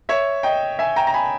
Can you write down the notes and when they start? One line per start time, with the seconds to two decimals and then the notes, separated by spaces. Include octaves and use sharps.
0.09 C#5 E5
0.43 D#5 G5
0.79 E5 G#5
0.96 G5 A#5
1.07 A#5
1.14 G#5 B5